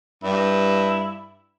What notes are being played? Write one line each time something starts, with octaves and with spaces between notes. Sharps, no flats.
G2 E4